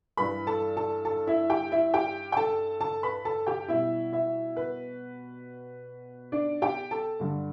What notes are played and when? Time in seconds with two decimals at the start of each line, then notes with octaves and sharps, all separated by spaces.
0.17 G2 E3 G3 B4 B5
0.47 A4 A5
0.77 A4 A5
1.05 A4 A5
1.27 E4 E5
1.50 G4 G5
1.72 E4 E5
1.94 G4 G5
2.32 G5
2.37 A4 A5
2.81 A4 A5
3.03 B4 B5
3.25 A4 A5
3.47 G4 G5
3.68 B2 G3 E4 E5
4.13 E4 E5
4.57 B4
6.32 D4 D5
6.62 G4 G5
6.91 A4 A5
7.20 G2 D3 G3